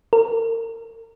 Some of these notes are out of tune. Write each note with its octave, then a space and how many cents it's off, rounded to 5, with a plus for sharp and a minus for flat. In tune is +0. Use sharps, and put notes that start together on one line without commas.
A#4 -35